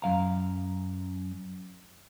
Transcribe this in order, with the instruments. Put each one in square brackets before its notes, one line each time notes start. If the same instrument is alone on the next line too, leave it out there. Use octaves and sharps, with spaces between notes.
[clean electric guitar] F#2 F5 A#5